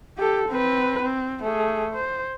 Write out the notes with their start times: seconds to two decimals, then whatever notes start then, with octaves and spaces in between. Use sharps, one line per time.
0.18 G4 A4
0.48 C4 B4
1.02 C4
1.43 A3 G#4
1.94 C5